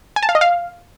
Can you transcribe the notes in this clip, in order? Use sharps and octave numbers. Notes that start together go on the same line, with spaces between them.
G#5
A5
F5
D#5
F5